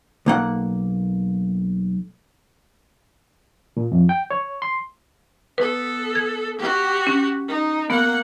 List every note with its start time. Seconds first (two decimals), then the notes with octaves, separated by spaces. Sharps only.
0.26 B1 A#3 F#5
3.77 A#2
3.92 F2
4.09 G5
4.31 C#5
4.62 C6
5.58 B3 A4 B4
6.15 G#6
6.59 F#4 G4
7.07 C#4
7.48 D#4
7.90 A#3 B3 F#5